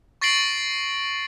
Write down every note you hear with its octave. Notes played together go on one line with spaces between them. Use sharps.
C#6 A6 A#6 C7 D7 F#7